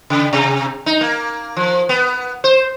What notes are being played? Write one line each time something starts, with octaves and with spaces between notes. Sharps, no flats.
C#3
C3
D#4
A#3
F3
B3
C5